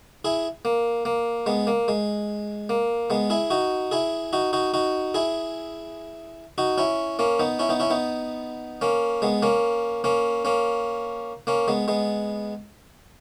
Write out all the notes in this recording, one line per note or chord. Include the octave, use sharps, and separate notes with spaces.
E4 G#4
A#3
A#3
G#3 B3
A#3
G#3
A#3
G#3 B3
E4 G#4
D#4 F#4
E4 G#4
D#4 F#4
D#4 F#4
D#4 F#4
E4 G#4
D#4 F#4
C#4 E4
A#3 C#4
B3 D#4
C#4 E4
B3 D#4
C#4 E4
B3 D#4
A#3 C#4
G#3 B3
A#3 C#4
A#3 C#4
A#3 C#4
A#3 C#4
G#3 B3
G#3 B3